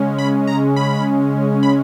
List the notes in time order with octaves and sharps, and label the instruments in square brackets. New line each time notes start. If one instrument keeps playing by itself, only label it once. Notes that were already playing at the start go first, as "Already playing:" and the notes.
Already playing: [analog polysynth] C#3 G#3 C#4
B5
A#5
B5
B5